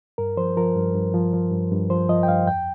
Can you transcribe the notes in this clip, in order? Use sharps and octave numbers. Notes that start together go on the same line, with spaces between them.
G2 A#4
F3 C5
F3 A#4
G2
G2
F3
F3
G2
G2
F3 C5
F3 D#5
G5
G2 F5
F2 G5